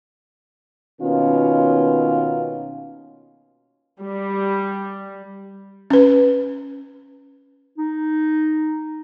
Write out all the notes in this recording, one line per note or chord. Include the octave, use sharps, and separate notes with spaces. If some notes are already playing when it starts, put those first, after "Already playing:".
B2 D#3 A#3 B3 C#4 F4
G3
C#4 B4
D#4